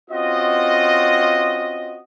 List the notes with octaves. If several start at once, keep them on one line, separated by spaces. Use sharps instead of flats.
C4 C#4 F4 F#4 D#5